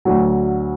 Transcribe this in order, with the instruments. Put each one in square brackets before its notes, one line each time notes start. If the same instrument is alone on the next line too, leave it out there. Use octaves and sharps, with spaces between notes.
[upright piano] D2 D3 F#3